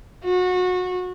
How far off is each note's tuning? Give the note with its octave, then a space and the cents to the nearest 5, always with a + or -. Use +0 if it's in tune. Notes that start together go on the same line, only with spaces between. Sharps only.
F#4 -25